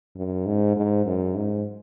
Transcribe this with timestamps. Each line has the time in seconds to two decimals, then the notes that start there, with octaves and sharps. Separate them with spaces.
0.16 F#2
0.46 G#2
0.76 G#2
1.05 F#2
1.36 G#2